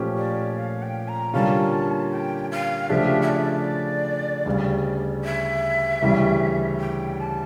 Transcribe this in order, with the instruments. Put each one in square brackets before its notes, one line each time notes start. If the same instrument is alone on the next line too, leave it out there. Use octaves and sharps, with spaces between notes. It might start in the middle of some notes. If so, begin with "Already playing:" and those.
Already playing: [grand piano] A#2 F3 A3 C#4 G4
[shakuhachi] D5
F5
G5
A#5
[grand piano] D3 G3 A#3 C#4 F4 [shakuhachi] A5
[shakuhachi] G5
F5
[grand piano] C#3 F3 A3 D4 G4 [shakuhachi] E5
[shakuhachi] E5
D5
[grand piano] D2 C#3 G3
[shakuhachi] E5
[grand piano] D2 C#3 E3 G3 C#4
[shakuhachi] G5
A5